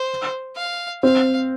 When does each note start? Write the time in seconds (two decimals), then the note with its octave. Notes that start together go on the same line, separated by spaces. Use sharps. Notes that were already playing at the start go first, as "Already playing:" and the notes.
Already playing: C5
0.56 F5
1.03 C4 F5